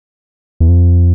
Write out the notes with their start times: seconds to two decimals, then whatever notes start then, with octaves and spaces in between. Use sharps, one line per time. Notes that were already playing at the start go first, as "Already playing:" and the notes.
0.60 E2
0.69 F2